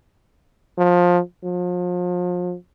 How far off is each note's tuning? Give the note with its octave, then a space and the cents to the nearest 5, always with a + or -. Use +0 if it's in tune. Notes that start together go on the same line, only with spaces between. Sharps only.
F3 +20
F3 +35